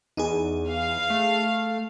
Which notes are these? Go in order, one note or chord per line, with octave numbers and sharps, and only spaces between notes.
E2 D#4 G#4
F5
A3